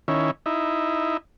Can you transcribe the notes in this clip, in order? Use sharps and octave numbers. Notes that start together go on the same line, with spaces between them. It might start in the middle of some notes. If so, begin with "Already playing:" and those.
D#3 C#4 E4
D#4 E4